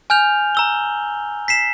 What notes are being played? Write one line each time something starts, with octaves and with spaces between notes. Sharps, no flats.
G#5 F6 G6 F7
A#5 E6 G7
B6 C7 E7